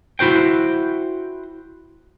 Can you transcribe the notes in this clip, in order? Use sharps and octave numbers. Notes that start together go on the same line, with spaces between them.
E4 F#4 C5 G5